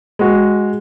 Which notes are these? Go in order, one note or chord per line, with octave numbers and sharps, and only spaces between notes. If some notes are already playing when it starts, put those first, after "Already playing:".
G#3 F#4